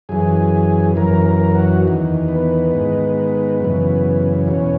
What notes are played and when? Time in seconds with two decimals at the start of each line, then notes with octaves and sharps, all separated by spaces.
0.09 F#2 E3 G#4
0.96 F#2 E3 A#4
1.26 A#4
1.55 F#4
1.85 E2 D#3
2.28 B3
2.72 G#2 D#3
3.60 F#2 C#3 E3
4.48 E2 B2 C#4